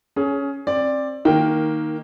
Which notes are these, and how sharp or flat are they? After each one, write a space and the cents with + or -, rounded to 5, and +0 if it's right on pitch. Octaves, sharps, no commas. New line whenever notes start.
C#4 +10 G#4 +25
C4 +30 D5 +5
D#3 +10 A#3 +0 G5 +0